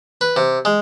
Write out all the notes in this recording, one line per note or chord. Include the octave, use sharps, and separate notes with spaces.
B4
C3
G#3